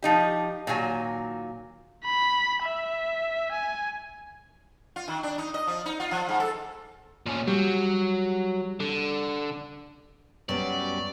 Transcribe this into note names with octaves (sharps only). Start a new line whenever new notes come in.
F3 D#4 G4
A#2 D#3 F#3 G#5
B5
E5
G#5
F4
D#3
D4
D#4
D#5
F3
D#4
F4
F3
G#2
A4
A#2 C#4
F#3 G3
D3
F#2 F#3 G3 B3 C#4 D5